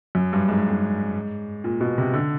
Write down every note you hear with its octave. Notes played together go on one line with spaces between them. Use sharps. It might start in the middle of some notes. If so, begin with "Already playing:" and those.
F#2
G2
G#2
G2
G#2
A#2
B2
C3
D3